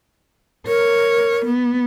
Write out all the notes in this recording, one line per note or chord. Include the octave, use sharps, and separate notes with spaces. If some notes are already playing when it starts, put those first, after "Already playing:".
A#4 C#5
B3